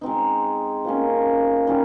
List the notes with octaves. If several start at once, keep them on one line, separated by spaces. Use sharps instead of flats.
G#3 C4 D#4
F3 A#3 C#4
D#3 G3 C#4 F4